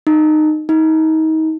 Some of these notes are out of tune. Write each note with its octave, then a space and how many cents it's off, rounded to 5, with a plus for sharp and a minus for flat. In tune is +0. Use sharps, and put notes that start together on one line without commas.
D#4 -20
D#4 +30